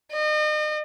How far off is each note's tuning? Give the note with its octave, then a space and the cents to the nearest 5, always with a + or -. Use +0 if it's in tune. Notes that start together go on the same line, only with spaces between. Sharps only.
D#5 -40